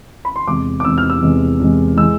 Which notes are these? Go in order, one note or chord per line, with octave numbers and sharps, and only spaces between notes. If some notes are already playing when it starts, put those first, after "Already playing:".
B5
C6
E2 C3 G#3 D6
D6
E2 C3 G#3 E6
F6
E6
E2 C3 G#3
E2 C3 G#3
E3 G#3 E6